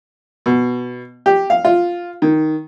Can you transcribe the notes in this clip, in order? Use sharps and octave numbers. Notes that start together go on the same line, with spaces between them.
B2
G4
F5
F4
D#3